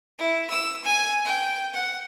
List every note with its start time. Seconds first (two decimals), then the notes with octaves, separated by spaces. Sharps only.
0.19 E4
0.50 E6
0.84 G#5
1.25 G5
1.74 F#5